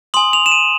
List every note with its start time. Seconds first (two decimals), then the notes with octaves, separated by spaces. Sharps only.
0.14 G#5 C6 D#6 F#7
0.33 F7
0.46 E7
0.52 D#7